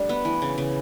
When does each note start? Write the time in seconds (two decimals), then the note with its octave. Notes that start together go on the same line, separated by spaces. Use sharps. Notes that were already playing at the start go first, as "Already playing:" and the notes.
Already playing: G3 A3 D4
0.09 B3
0.25 E3
0.42 C#3
0.58 C#3